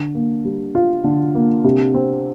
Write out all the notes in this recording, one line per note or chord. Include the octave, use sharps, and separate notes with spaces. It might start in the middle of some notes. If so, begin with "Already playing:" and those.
Already playing: D3
A#3
G3
F4
D3
A#3
C3
C4